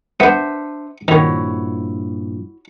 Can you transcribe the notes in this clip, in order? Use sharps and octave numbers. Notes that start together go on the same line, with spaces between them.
B3 D4 C5 E5
G2 A#2 D#3 F3 E4 F#4 C#5